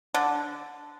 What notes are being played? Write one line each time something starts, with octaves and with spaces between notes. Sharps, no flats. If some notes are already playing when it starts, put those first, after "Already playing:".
D3